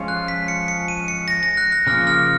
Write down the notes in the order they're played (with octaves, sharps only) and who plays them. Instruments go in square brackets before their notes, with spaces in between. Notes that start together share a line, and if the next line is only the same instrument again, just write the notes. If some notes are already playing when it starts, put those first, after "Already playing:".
Already playing: [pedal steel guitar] F3 G#3 C#4 F4
[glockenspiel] F#6
B6
C#7
C#7
D#7
C#7
A#6
A#6
F#6
F#6
[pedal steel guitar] C#3 F3 A#3 [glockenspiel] F6
[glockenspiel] F6